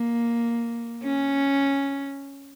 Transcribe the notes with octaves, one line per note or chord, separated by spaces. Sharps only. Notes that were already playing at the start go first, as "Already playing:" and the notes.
Already playing: A#3
C#4